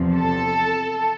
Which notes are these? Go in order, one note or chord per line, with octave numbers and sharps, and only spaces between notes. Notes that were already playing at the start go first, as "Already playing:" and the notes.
Already playing: E2 C3 F3
A4